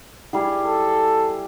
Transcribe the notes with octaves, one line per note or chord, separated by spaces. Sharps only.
G3 E4 G#4
A4